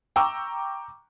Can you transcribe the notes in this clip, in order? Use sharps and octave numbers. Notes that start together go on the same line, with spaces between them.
G5 A#5 C#6 D6 E6